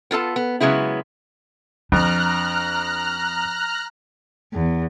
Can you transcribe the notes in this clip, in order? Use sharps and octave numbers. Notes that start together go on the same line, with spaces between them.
B3 F4 A4 A5
B3
C#3 F#3 G#3 B3 E4
F2 D4 A#5 F6 F#6
E2